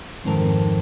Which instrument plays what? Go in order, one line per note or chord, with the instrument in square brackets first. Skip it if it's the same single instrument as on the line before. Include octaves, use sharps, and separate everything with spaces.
[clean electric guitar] F2 G#2 D#3 C4 A4 A#4